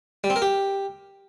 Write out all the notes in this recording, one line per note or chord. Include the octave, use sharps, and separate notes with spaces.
G3
C4
A#4
G4